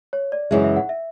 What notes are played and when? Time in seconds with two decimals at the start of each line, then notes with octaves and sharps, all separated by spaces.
0.13 C#5
0.32 D5
0.51 F#2 C#3 E3 G#3 E5
0.64 E5
0.76 F#5
0.89 E5